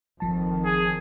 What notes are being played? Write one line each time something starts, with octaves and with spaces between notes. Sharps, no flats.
G1 F2 D#3 F3 A5
G#4